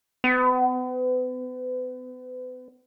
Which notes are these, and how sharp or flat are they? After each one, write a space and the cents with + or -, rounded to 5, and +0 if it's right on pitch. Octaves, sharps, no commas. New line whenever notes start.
B3 +40